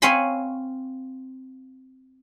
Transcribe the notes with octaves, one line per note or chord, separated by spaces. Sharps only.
C4 C#5 F5 G#5 B5 C6